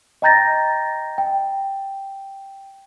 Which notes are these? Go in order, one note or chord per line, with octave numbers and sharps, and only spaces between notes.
D#5 G5 A#5 G6 A6 A#6
G5